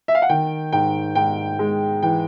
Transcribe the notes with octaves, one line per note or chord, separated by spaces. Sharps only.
E5
F5
F#5
D#3 G5
G#2 G5
G#2 G5
G#3
E3 G5